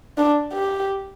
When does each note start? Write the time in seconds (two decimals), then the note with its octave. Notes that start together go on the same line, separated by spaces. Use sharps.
0.18 D4
0.53 G4